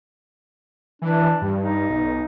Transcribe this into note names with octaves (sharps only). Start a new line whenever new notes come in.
E3 D4
G2
D#4
B1